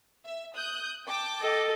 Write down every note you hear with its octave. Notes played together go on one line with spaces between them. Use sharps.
E5
D#6 F#6 G6
G5 A5 D6
A4 D#5